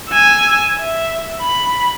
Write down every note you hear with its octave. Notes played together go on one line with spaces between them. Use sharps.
G#5 E6
E5
B5